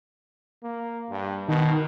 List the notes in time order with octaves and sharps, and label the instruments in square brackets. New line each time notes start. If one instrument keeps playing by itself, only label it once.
[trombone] A#3
G2
[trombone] B2 [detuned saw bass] D#3